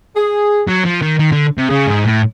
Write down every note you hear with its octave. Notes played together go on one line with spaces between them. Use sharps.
G#4
F#3
F3
D#3
D#3
D3
C3
C#3 G#4
G#2
A2